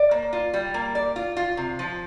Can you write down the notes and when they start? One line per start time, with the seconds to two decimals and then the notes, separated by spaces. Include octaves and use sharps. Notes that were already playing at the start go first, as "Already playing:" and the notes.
Already playing: D5
0.11 A#3
0.33 F4
0.54 G3
0.74 A#3
0.95 D5
1.16 F4
1.37 F4
1.57 C3
1.79 F3